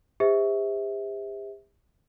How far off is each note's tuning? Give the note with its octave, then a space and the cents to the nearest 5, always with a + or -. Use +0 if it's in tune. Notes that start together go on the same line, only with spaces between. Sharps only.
G4 +45 C5 -25 E5 -20